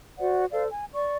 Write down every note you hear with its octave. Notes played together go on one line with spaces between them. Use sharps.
F#4 C5 D5 F#5
A4 C5 D5 F5
G#5
D5 C#6